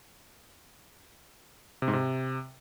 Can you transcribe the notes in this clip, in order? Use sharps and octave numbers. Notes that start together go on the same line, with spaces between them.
C3
G#2
C3